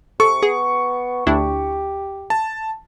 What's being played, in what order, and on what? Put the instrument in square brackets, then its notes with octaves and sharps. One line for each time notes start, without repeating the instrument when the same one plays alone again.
[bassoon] C3 [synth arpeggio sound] A4 [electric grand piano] C#6
[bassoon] B3 [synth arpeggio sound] G#4
[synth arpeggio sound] D2 D4 E4 [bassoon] G4
[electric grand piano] A5